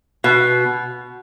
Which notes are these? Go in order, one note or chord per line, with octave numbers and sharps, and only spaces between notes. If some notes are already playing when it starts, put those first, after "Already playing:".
B2